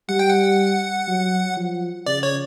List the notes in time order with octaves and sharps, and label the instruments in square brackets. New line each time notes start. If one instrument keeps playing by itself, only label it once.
[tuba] G3 [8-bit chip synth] F#5
[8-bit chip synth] G5
F#5
[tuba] F#3
F3
[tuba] C#3 [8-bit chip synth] D5
[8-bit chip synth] C#5